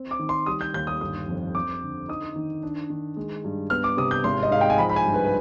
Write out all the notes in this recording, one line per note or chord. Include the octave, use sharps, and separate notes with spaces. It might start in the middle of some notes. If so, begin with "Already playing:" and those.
Already playing: C4
D6
D#3
C6
G3 D#6
G6
D#2 G6
D#6
G1 D#6
F2
C4 D6
D3
D#4 D#6
D#3
D4
D#3
G#3
G2
B3 F6
D6
C3 D#6
G6
G#1 C6
D#5
G#2 F5
G5
G#5
F3 B5
B5
G#5
G2
B4
B4